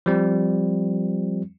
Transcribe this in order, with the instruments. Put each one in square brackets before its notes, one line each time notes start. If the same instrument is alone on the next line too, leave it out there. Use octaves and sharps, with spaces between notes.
[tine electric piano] F3 G3 C4